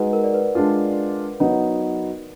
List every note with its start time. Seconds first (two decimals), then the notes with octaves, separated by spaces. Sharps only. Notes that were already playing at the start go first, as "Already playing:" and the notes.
Already playing: G#3 D#4 F#4 B4 F#5
0.13 A#4
0.24 D5
0.34 B4
0.55 G#3 D4 F4
1.40 F#3 B3 D#4